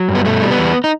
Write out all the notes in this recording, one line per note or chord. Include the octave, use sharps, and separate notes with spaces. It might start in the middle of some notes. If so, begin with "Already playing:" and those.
Already playing: F#3
G2
B3
B2 A3
G3
B3
E2
D#4